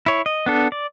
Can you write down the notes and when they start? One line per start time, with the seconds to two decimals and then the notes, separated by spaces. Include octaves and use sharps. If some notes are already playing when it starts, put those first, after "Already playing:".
0.06 E4 C#5
0.26 D#5
0.46 B3 D4 A4
0.72 D5